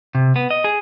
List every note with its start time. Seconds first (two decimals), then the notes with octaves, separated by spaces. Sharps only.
0.15 C3
0.36 B3
0.51 D#5
0.64 G#4